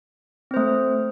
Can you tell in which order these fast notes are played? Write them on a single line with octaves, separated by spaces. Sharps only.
C4 C5 A3